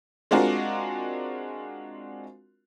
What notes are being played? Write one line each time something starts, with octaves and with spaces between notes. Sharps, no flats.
G#3 C4 D4 F4 F#4 A#4